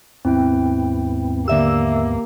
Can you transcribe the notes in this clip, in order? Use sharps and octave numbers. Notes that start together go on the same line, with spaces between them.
D#2 G#2 B3 C4 E4 G5
D3 A#3 G4 E5 E6